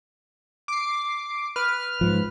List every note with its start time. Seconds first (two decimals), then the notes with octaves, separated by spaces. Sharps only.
0.68 D6 C7
1.56 B4 F6
2.01 G#2 F3